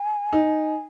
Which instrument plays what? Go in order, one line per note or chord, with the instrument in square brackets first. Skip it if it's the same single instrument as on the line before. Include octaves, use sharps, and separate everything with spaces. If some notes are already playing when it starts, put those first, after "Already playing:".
Already playing: [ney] G#5
[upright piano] D#4